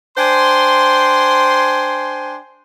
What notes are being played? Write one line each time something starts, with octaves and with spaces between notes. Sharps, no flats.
D4 C5 G5 G#5 C6